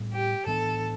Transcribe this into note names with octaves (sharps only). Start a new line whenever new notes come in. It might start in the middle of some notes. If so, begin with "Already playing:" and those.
Already playing: A2 G3 B3
G4
A2 E3 B3 D4 A4